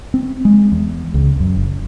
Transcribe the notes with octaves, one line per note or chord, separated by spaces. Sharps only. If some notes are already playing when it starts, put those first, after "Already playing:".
C4
G#3
E2
C#2
F#2
F#1